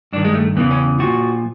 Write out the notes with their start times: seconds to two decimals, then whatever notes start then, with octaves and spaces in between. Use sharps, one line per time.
0.13 G2 D4
0.16 D#3
0.25 G#3
0.35 A3
0.56 E2 C#3 E3 B3
0.71 C#4
0.99 A#2 F3 F#4